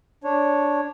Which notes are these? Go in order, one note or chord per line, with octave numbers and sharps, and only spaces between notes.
D4 C#5